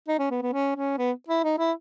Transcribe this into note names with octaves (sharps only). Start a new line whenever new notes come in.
D#4
C#4
B3
B3
C#4
C#4
B3
E4
D#4
E4